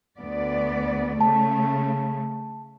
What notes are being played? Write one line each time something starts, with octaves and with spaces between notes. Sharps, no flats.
D2 B3 D5
C#3 A3 A5